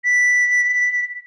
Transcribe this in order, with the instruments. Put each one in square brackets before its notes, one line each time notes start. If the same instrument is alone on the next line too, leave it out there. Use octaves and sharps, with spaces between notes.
[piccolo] B6